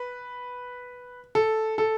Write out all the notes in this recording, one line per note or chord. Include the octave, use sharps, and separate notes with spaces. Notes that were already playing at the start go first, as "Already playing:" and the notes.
Already playing: B4
A4
A4